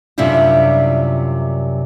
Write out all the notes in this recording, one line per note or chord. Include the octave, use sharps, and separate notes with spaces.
F#2 C3 G3 D4 E4 F4